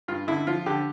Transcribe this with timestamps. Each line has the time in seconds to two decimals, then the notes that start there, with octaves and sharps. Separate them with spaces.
0.08 G2 F4
0.28 D3 E4
0.47 F3 F4
0.66 D3 G4